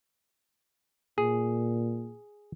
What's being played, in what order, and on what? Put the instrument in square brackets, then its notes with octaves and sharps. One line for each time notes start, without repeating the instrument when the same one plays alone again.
[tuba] A#2 [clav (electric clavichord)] G#4